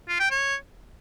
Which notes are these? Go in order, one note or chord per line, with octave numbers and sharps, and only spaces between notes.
F4
G5
C#5